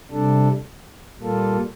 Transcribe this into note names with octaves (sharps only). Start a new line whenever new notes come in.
C3 G3 D4 A4
A#2 G3 A#3 F4 A4